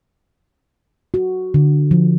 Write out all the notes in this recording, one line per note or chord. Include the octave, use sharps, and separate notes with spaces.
F#4
D3
F3